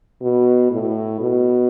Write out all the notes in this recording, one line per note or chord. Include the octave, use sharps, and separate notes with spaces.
B2
A2
B2